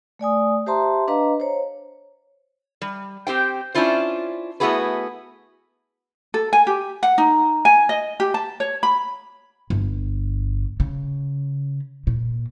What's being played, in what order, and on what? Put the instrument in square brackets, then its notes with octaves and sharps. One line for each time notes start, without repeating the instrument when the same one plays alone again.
[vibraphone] A3 D5 G#5 D#6
G4 C5 E5 A5 A#5 C6
D4 B4 D#5 F5 A#5
C5 C#5
[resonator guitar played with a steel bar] G3
C4 G4 C5 G5
C#4 D4 E4 F4 C5
A3 B3 E4 F#4 G#4 B4
[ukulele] A4
G#5
G4
F#5
D#4
G#5
D#5
G4
A5
C#5
B5
[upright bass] G1
C#3
A#2